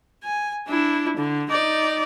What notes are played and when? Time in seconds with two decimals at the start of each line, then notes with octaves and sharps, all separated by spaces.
0.24 G#5
0.68 D4 E4
1.17 D3
1.50 D#4 D5